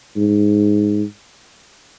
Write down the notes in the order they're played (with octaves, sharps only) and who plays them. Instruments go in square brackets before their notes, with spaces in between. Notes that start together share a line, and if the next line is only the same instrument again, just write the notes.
[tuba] G#2